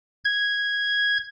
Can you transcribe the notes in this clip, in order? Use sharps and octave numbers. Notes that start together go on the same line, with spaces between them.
G#6